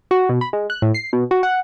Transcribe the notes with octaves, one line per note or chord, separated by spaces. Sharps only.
F#4
B2
B5
G#3
F#6
A2
C7
B2
F#4
F#5